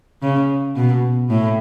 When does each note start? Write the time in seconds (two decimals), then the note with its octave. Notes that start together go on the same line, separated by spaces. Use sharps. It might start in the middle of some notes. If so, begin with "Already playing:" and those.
0.22 C#3
0.76 B2
1.30 A2